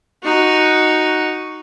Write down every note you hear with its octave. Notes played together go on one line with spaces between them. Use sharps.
D#4 F#4